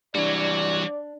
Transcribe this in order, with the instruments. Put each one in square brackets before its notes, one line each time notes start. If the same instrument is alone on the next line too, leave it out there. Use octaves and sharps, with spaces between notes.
[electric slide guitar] E3 G3 [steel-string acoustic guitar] D4 [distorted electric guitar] F#4 C#5 [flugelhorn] D5